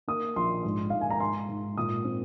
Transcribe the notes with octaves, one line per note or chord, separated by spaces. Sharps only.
A#3 D#6
A#1 C6
G#2
G#2 F5
G#5
A#5
G#2 C6
G#2
A#2 D#6
C4